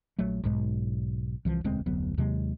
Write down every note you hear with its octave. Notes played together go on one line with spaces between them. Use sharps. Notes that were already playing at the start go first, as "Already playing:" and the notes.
A#1 F#3 A3
B1 G#2 G#3
C2 E3 F3
E1 D2 G#3 C4
F1 D2 F#3 B3
D#2 C3 F#3 G#3